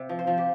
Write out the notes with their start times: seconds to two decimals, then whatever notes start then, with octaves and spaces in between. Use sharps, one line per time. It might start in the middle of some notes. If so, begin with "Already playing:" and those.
Already playing: C3
0.09 F3
0.19 C5
0.27 F3
0.38 G4